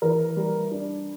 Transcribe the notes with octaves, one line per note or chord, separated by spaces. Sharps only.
E3 A#4
G3
D4